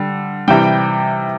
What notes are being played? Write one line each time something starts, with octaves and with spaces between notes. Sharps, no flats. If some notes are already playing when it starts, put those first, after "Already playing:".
Already playing: D3 G3
C3 E3 G3 G5